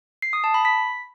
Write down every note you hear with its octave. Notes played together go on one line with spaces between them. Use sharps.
C7
D#6
A5
B5
B6